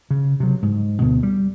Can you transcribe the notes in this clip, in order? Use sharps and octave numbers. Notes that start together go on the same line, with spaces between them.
C#3
C3 F#3
G#2
D2 B2 D3
G3